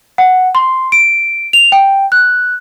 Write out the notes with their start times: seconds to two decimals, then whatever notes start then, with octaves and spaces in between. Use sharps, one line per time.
0.18 F#5
0.55 C6
0.92 D7
1.53 F7
1.72 G5
2.12 F#6